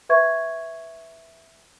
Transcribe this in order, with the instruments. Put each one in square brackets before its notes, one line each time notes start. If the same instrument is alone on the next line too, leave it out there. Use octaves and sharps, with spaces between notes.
[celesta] B4 E5 C#6 G#6